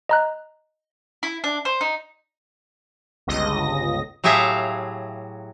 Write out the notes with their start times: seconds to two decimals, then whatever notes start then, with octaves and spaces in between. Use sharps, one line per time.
0.09 D#5 A#5 F#6
1.23 E4
1.44 D4
1.65 C5
1.81 D#4
3.27 G1 C#2 D#5 A#6
4.24 A2 F#3 G4 G#4 E5 F5